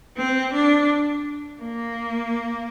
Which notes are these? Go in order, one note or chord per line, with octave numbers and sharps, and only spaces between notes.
C4
D4
A#3